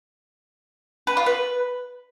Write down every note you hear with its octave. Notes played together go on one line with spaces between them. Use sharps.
B4
F4
B4